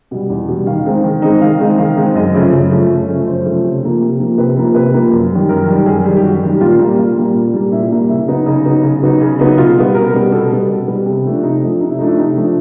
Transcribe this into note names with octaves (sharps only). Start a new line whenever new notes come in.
B2 G3
E2
B2 G3
D#3 F5
G#3 C4 D#4
D#3
G#3 C4 D#4
D#3 F5
G#3 C4 D#4
D#3 F5
G#3 C4 D#4
F#2 D#5
C#3 F3 A3 C#4
F#2
C#3 F3 A3 C#4
F#2
C#3 F3 A3 C#4
F#2 C5
C#3 F3 A3 C#4
C3
F3 A#3
C3
F3 A#3
C3 B4
F3 A#3
C3 B4
F3 A#3
F#2
D#3 G3
F#2 A#4
D#3 G3
F#2 G#4
D#3 G3
G4
F#2 F#4
D#3 G3
A#2 F4
G3 A#3
A#2 F4
G3 A#3
A#2
G3 A#3
A#2 E4
G3 A#3
C#3 E4
F#3 B3 D#4
C#3 D#4
F#3 B3 D#4
C#3
F#3 B3 D#4
C#3
F#3 B3 D#4
B2 F4
G3 B3
B2 A#4
G3 B3
B2 A4
G3 B3
B2
G3 B3
C3
F3 A3 D4
C3 D#4
F3 A3 D4
C3 D#4
E4
F3 A3 D4 D#4
E4
C3 D#4
F3 A3 D4